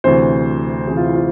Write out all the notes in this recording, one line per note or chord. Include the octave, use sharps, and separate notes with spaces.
D2 C3 E3 C5
D2 C3 E3 G#4
F4
E4
F4